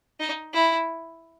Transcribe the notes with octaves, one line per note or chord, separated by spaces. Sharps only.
D#4
E4